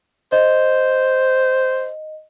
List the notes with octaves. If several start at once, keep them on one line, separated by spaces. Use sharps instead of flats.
C5 D#5